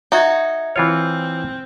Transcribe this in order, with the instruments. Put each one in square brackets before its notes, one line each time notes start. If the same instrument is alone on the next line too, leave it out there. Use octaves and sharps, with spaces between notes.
[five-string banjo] D#4 F#4 [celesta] E5 G#6
[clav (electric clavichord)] E3 F4 C#5 [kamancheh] C4 [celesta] F6